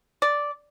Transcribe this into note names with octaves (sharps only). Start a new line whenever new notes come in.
D5